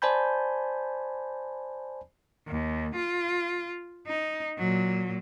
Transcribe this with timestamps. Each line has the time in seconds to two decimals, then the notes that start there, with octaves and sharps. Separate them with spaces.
0.02 C5 D5 G#5 A5 B5 G6
2.48 D#2
2.96 F4
4.07 D#4
4.58 A#2 F#3